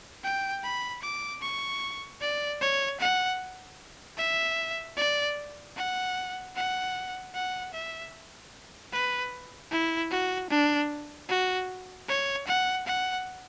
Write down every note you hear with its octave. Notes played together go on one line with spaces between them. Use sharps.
G5
B5
D6
C#6
D5
C#5
F#5
E5
D5
F#5
F#5
F#5
E5
B4
E4
F#4
D4
F#4
C#5
F#5
F#5